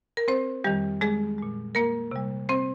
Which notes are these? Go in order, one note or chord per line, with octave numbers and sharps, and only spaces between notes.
A#4
C4 C5
F2 D#3 G3 G4
G#3 G#4
A#2 G#3
A#3 A#4
C3 G3
C4 C5